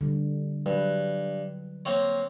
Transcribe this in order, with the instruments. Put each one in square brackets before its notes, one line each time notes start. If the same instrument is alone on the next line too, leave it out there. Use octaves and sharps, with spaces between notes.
[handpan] D3 G3
[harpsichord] G2 [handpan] F#3 B4
[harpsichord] A#3 C4 C#5